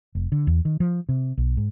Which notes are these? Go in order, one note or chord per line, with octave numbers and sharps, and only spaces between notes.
F1
D3
E2
D#3
F3
C3
B1
G#2